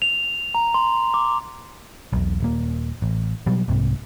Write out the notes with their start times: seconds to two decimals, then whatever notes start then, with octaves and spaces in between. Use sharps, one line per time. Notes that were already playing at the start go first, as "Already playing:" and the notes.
0.02 F7
0.55 A#5
0.74 C6
1.14 D6
2.13 E1 B1
2.40 D#1 A#3
3.02 A1
3.46 B2 F#3 G3
3.68 C2 G#2 C3